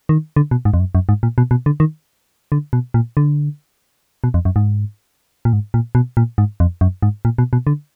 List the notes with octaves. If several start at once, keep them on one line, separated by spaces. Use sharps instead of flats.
D#3
D3
B2
G#2
F2
F#2
F#2
G#2
A#2
B2
B2
D3
D#3
D3
B2
A#2
D3
B2
F2
F#2
G#2
A#2
G#2
A#2
B2
A#2
G#2
F2
F#2
G#2
A#2
B2
B2
D3